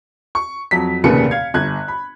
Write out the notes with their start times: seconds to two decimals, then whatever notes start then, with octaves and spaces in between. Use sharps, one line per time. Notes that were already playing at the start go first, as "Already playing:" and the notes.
0.35 C#6
0.71 F2 F#3 B6
1.04 F1 D#2 A#2 C#3 B4 C#7
1.31 F5 G#6
1.54 G1 F#6 G#6
1.88 B5